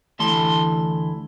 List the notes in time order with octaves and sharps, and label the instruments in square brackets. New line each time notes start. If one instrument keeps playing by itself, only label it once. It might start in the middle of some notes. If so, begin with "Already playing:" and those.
[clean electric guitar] D2 E3 A3 A5 C6